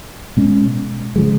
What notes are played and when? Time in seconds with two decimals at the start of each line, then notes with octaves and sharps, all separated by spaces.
0.37 B2 G#3 C#4
1.16 C#3 F3 G#3